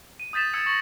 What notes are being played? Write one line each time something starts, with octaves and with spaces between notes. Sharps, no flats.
D#7
D#6 G6 A6 B6 E7
D#6 E6 G#6 C#7
C#6 A#6 F#7